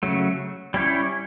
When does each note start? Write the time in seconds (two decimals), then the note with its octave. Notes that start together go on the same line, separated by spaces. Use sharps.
0.03 C#3 F#3 A3
0.74 G3 C#4 E4 G4 C#5